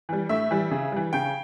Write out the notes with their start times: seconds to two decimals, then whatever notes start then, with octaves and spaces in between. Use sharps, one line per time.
0.09 E3 G3
0.29 A2 E5
0.51 E3 G3
0.71 C#3
0.92 E3 G3
1.13 C#3 G5